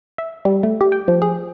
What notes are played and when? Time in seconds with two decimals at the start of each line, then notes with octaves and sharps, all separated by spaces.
0.18 E5
0.45 G3
0.63 A3
0.81 G4
0.92 G5
1.08 F3
1.22 G#4